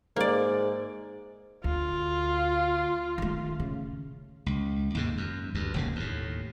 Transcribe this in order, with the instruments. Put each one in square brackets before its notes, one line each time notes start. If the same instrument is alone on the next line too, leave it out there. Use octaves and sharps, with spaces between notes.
[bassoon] G#2 [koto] A#3 D5
[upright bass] D2 [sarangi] F4
[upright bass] D#3 A3
C#3
[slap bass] C#2
D#2 G#2 C3
F#2
D2 G2
E1 D#2 C#3
D#2 A2